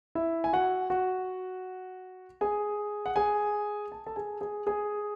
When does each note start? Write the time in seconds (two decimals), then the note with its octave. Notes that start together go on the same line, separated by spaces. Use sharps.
0.15 E4 E5
0.44 G#5
0.53 F#4 F#5
0.90 F#4 F#5
2.41 G#4 G#5
3.06 F#5
3.16 G#4 G#5
3.92 A5
4.06 A4 A5
4.16 G#4 G#5
4.41 G#4 G#5
4.67 G#4 G#5